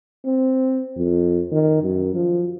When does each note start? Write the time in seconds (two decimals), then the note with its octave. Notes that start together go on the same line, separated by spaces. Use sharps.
0.25 C4
0.97 F2
1.51 D#3
1.83 F#2
2.14 F3